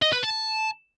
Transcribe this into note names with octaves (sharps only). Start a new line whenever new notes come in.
D#5
B4
A5